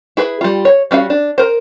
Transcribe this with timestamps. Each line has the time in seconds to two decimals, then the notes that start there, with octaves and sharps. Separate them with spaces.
0.17 E4 G#4 B4
0.41 G3 F4
0.65 C#5
0.91 G3 C#4 F#4 F5
1.10 D4
1.38 A#4 C5